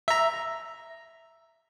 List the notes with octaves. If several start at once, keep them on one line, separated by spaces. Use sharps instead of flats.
E5 A#5